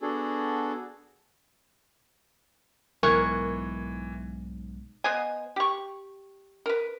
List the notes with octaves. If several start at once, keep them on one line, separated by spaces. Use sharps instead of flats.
B3 D4 F#4 G#4 A4
B1 G#2 E3 A#4 C#6 F#6 G#6
B3 C5 D#5 G#5
G4 C#6
A#4 B4